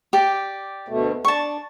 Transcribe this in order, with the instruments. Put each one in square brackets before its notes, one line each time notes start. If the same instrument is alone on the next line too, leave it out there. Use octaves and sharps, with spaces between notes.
[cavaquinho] G4 D5
[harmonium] D2 B2 A3
[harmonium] D4 [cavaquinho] A5 C#6